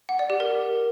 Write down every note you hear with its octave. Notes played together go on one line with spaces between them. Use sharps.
F#5
D5
G4
A#4